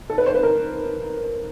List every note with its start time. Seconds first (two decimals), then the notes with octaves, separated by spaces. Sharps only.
0.10 A4
0.18 B4
0.26 C5
0.35 B4
0.43 A#4